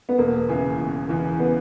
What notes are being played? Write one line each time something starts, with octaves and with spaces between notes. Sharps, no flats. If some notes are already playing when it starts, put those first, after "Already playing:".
B3
E1 A#3
E2 C#3 E3
E1
E2 C#3 E3
B3